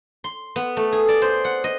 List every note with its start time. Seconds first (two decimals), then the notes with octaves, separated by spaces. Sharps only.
0.24 C6
0.56 B3
0.77 A3
0.92 G#4
1.09 D5
1.22 C5
1.45 F#5
1.64 D#5